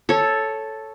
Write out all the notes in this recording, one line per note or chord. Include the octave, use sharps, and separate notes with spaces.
A4 C#5